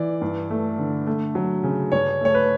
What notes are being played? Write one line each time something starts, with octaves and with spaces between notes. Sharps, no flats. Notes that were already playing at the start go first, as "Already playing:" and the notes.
Already playing: E3 D5
G2
A3
D3
A3
F#3
C#3
G2 C#5
A3 C#5
B4